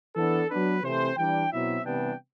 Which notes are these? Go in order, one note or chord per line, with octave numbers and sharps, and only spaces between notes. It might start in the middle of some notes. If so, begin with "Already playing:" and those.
E3 B3 D4 A4
F#3 B3 D4 B4
C3 E3 A3 C4 C5
E3 G3 D4 G5
B2 F#3 C4 E4 E5
C3 E3 G3 B3 D4 G5